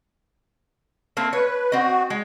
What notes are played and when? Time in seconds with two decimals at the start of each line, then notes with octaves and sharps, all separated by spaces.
1.17 A3 A#3 C4
1.33 B4 C#5
1.72 C4 F#4 D#5
2.10 G#3